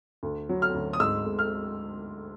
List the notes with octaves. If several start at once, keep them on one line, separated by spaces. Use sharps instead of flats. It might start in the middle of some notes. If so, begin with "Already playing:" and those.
D2
F#3
F6
D2
D#6
G#2 E6
G#2
F6